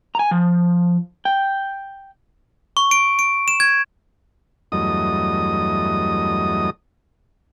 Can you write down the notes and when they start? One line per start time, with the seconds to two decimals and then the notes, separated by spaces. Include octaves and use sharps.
0.15 G#5 A#5
0.31 F3
1.25 G5
2.77 C#6
2.91 D7
3.19 D7
3.48 E7
3.60 G#6
4.72 E2 G2 F#3 A3 D#5 D#6